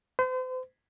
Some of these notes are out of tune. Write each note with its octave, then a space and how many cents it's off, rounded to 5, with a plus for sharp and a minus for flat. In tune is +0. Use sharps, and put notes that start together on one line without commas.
C5 -40